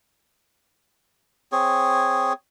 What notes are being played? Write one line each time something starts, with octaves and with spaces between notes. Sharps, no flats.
C4 G#4 C#5